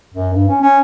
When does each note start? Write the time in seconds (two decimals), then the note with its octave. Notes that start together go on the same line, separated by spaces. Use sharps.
0.14 F#2
0.34 G2
0.48 C#4
0.61 C#4